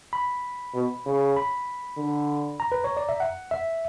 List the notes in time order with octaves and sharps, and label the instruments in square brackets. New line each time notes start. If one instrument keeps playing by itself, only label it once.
[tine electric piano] B5
[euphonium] B2
C#3
[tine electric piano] B5
[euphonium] D3
[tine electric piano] A#5
B4
C#5
D5
E5
F#5
E5